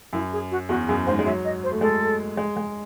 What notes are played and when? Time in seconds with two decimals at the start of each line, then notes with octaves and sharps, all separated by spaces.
0.13 F#2 E4
0.33 G#4
0.51 F#4
0.69 E2 F#4
0.88 F#2 G#4
1.06 G#2 C5
1.19 G#3
1.26 F#3 E5
1.45 D#5
1.64 C5
1.72 A3
1.81 G#3 A4
2.37 G#3
2.57 G#3